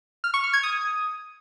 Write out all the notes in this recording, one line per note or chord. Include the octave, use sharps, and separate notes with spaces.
F6
C#6
F6
G#6
D#6